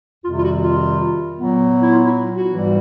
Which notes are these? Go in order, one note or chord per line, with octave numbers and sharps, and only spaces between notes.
F2 C3 D#3 G3 F4
F4
F#4
F4
A#2 F#3 B3
E4
F4
E4
F#4
G#2 E3 G3